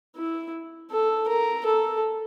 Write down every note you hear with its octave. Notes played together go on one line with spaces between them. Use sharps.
E4
A4
A#4
A4